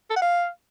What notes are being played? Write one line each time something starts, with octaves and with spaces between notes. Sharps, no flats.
A4
F#5
F5